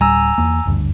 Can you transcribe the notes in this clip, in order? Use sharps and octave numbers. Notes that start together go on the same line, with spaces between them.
D1 G3 G#5 A#5 E6
E2 A#3
F#1 D2 G2